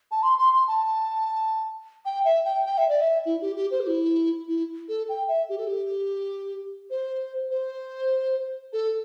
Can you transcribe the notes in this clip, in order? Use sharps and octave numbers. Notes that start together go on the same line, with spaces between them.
A5
C6
C6
C6
A5
G5
E5
G5
G5
E5
D5
E5
E4
G4
G4
C5
G4
E4
E4
A4
G5
E5
G4
A4
G4
C5
C5
A4